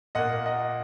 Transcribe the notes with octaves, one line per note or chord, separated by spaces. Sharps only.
A#2 A#3 D#5 F#5
D#5 F#5